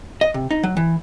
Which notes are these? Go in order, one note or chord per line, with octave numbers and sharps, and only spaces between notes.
D#5
C3
D#4
F#3
E3